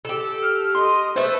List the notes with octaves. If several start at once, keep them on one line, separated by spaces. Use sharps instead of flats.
G4 A4
F6
D#5 C6
A3 A4 B4 C5